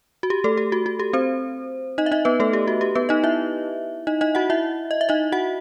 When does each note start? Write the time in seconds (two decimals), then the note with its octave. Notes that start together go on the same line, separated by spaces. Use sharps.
0.23 F#4
0.30 G4
0.44 A3 A4
0.57 G4
0.72 F#4
0.86 F#4
0.99 G4
1.13 C4 C5
1.98 D#4 D#5
2.06 E5
2.12 D#4 D#5
2.25 B3 B4
2.40 A3 A4
2.53 G4
2.68 F#4
2.81 G4
2.95 B3 B4
3.09 D#4 D#5
3.24 E4 E5
4.07 D#4 D#5
4.21 D#4 D#5
4.35 F#4 F#5
4.50 E4 E5
4.91 D#5
5.01 E5
5.09 D#4 D#5
5.32 F#4 F#5